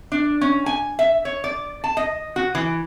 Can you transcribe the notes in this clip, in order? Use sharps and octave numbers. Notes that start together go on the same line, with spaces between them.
D4
C#4
G#5
E5
C#5
D5
A5
D#5
F#4
E3